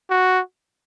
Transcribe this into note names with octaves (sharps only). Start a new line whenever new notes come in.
F#4